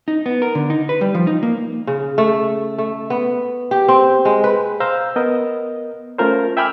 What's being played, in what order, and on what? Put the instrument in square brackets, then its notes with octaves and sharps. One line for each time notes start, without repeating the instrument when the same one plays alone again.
[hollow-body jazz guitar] D#4
B3
A#4
D3
D#4
B4
G3
F3
D#4
A#3
[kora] C#3
A3
A3
B3
G4
C4
G#3
B4
[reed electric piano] C5 F5 A#5 E6 G6
B3 A#4 D#5
A3 C#4 F4 A#4 C5
E5 G5 G#5 B5 D6 F6